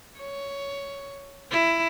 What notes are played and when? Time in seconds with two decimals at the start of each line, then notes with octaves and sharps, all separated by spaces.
0.18 C#5
1.51 E4